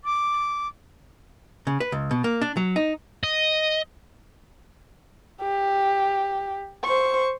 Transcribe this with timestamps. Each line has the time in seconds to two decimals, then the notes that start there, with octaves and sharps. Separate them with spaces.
0.04 D6
1.67 C#3
1.80 B4
1.92 C#2
2.11 B2
2.24 A#3
2.42 D4
2.57 F#3
2.76 D#4
3.23 D#5
5.41 G4
6.84 C5 C#6